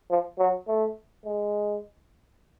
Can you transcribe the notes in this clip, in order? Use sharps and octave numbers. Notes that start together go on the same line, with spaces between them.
F3
F#3
A3
G#3